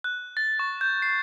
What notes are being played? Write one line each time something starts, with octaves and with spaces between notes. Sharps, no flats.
F#6
A6
C#6
G6
C7